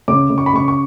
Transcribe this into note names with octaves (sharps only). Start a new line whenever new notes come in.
C#3 D6
C#3
C#6
B5
C#3 C#6
C#6